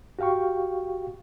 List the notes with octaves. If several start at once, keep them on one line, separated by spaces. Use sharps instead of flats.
F#4 G4 F5 G5 C#6